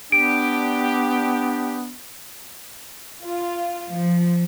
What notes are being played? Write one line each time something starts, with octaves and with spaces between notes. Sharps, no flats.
B3 D4 G4 D7
F4
F3